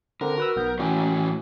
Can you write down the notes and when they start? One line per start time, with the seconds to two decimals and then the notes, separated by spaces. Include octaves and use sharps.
0.21 D3 C4 D4 A#4
0.38 F#4 B4 E6
0.56 B1 B3 G6
0.79 A2 E3 C#4 F#4 G5 G#5